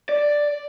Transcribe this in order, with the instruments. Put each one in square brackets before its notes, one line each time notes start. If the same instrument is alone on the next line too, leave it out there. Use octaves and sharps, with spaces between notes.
[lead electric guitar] D5